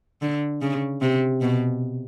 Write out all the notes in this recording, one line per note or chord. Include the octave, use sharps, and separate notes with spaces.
D3
C#3
C3
B2